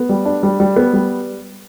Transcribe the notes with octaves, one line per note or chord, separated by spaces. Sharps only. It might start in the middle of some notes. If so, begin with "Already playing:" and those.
Already playing: B3
G3
D4
G3
G3
B3
G3